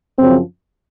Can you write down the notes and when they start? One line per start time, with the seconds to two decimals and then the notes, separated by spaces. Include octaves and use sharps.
0.19 F#2 C#3 F3 C4